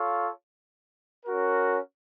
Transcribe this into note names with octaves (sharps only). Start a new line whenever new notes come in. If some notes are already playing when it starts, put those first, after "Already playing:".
Already playing: F4 A4 C#5 F5
C#4 F#4 A#4